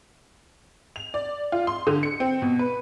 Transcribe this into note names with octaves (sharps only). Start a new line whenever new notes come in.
F7
D5
F4
C6
D3
C#7
C4
B2
B4